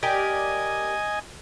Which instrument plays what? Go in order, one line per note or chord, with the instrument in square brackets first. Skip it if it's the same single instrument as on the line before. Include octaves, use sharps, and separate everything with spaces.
[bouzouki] G4 A#4 D5 [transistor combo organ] D#5 G#5